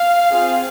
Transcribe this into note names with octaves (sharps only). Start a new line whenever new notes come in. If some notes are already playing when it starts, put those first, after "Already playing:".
Already playing: F5
C4 F4 G#4